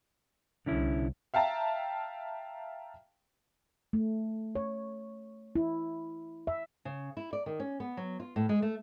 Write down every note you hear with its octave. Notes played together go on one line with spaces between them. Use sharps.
C2 D3 C#4 E4
E5 F5 G5 A5 A#5
A3
C#5
E4
E5
C#3
E4
D5
D#3
C#4
B3
F#3
F4
A2
G#3
A3